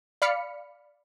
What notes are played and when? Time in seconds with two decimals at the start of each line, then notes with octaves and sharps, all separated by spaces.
0.22 D5 F5 B5 F6 B6 C#7